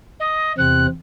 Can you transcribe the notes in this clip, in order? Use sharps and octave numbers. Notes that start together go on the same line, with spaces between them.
D#5
E2 C3 C4 F#6